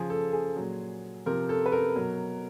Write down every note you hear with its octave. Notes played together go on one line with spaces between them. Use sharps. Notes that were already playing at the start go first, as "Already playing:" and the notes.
Already playing: C#3 F3 G#4
A4
G#4
A#2 F#3
C3 F3 A#4
A4
B4
A#4
B2 F#3